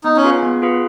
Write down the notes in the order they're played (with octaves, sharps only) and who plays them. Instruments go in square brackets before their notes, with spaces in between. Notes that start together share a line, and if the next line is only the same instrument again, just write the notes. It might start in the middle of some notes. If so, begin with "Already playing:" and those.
[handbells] B3 [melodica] D#4
[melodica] C#4
[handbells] F4 G#4 B4 F5
B3
F4 G#4 B4 F5